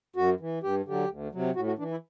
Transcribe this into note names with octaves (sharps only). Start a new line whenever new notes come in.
F#2 F#4
E3
G2 G4
D3 F#3 G4
D2
C3 F#3
A2 F#4
F#4
E3 D4
E4